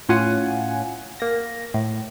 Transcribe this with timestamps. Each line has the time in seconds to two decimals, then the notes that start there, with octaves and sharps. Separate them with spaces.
0.09 A2 C#4 F4 F#5 G#5
1.20 A#3 A#6
1.74 A2